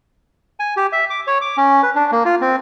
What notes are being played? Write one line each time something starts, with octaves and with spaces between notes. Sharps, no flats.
G#5
G4
E5
D6
C#5
D6
C#4
B4
D4
A#3
F4
C4